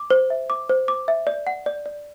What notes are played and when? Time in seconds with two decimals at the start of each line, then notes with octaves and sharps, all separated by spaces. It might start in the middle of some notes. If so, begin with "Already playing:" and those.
Already playing: D6
0.10 C5
0.30 E5
0.50 D6
0.69 C5
0.88 D6
1.08 E5
1.27 D5
1.47 F#5
1.66 D5
1.86 D5